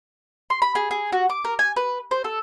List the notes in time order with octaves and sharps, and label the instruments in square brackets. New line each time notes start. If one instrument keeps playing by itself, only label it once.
[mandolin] C6
B5
G#4
G#4
F#4
D6
A#4
G#5
B4
C5
A4